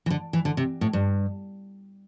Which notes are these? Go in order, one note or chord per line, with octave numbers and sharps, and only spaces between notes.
E3
D3
E3
D3
C3
A2
G2